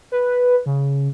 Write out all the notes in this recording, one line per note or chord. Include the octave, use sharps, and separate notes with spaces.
B4
C#3